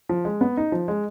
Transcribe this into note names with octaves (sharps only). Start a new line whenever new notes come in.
F3
G#3
B3
D#4
F3
G#3